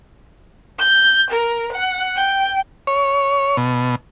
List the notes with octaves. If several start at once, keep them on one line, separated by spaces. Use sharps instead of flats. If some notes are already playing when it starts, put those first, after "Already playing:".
G6
A#4
F#5
G5
C#5
B2